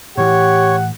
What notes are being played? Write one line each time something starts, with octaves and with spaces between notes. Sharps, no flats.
A2 E3 G4 C#5 F#5